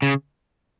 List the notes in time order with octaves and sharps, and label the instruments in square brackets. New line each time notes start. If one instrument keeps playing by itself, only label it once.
[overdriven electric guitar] C#3